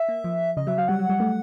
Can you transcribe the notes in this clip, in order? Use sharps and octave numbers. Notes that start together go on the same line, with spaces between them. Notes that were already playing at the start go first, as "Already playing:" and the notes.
Already playing: E5
A#3
F3
C#3 D#5
F#3 E5
F#3 F5
G3 F#5
F#3
G3
A3